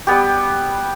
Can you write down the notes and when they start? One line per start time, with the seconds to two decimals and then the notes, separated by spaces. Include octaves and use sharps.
0.07 G3 B3 G4